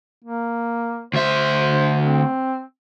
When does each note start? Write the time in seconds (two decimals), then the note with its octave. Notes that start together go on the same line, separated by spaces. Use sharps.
0.24 A#3
1.13 D2 C5 E5
2.04 C4